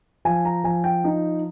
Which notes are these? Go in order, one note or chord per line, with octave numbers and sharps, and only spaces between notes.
F3 G#5
A#5
F3 G#5
G5
D#4